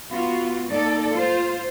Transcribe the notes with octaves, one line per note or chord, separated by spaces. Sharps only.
B3 F4 F#4
A#3 D#4 A4 D5
F4 C5